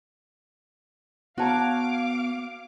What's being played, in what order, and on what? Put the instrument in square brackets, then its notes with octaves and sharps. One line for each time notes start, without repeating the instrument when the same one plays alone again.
[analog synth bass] B3 [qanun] F#4 C#5 [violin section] F5 D6 [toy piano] F#5 A5 A#5